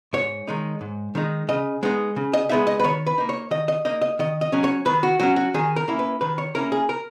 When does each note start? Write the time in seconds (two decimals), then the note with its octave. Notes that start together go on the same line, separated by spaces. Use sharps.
0.13 G#2 C#5
0.48 D#3 G#3 D#4
0.81 G#2
1.15 D#3 G#3 D#4
1.48 C#3 D#5
1.83 G#3 B3 D#4
2.16 C#3
2.33 D#5
2.49 G#3 B3 D#4 E5
2.67 D#5
2.80 B4
2.84 D#3 C#5
3.06 B4
3.18 A#3 D#4
3.29 C#5
3.51 D#3 D#5
3.68 D#5
3.85 A#3 D#4 D#5
4.01 D#5
4.19 D#3 D#5
4.41 D#5
4.52 F#3 C#4
4.64 C#5
4.86 D#3 B4
5.03 F#4
5.19 F#3 C#4 F#4
5.36 F#4
5.54 D#3 G#4
5.76 A#4
5.88 A#3 C#4 E4
5.99 B4
6.21 D#3 B4
6.38 C#5
6.55 A#3 C#4 E4 A#4
6.72 G#4
6.89 A#4